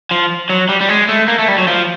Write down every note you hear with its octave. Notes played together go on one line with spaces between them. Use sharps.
F3
F#3
G3
G3
G#3
A3
A#3
A3
G3
F#3
F3